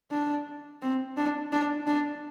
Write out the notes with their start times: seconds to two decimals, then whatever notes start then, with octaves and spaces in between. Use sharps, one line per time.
0.11 D4
0.82 C4
1.17 D4
1.52 D4
1.87 D4